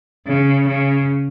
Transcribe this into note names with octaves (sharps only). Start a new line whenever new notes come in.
C#3
C#3